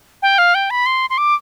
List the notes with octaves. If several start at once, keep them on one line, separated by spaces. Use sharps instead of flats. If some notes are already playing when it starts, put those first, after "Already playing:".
G5
F5
G5
B5
C6
C6
D6